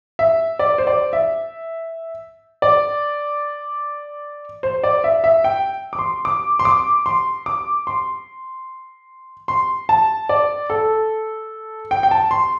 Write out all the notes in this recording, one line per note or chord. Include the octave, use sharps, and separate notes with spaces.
E5
D5
C5
D5
E5
D5
C5
D5
E5
E5
G5
D6
C6
D6
C6
D6
C6
D6
C6
C6
A5
D5
A4
G5
G5
A5
C6